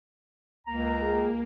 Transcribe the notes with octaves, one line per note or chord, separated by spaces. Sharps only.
C#2 A#3 A#5
G#4